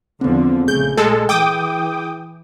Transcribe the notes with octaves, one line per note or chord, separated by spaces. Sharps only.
E2 D3 F3 B3 C4
A#1 C#3 A3 G#4 G6
A#2 G#3 A4
E3 G5 D6 D#6